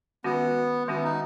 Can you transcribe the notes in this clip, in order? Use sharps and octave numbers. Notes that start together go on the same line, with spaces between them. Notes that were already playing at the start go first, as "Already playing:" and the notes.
D#3 G#3 B3 C#4 F#4
D#3 G#3 B3 C#4 F#4
D#4